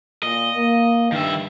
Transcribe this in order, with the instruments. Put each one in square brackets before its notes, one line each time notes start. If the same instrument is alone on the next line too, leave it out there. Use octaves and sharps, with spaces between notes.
[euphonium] A#2 [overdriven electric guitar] D#5
[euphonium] A#3
[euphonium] G2 [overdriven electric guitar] D#3 E5